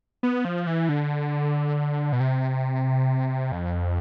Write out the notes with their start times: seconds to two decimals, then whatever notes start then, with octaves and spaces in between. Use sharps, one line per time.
0.23 B3
0.45 F3
0.67 E3
0.89 D3
2.13 B2
2.20 C3
3.52 F2